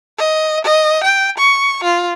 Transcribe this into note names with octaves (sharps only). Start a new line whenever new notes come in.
D#5
D#5
G5
C#6
F4